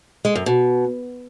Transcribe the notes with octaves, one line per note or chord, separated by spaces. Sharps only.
G#3
F#2
B2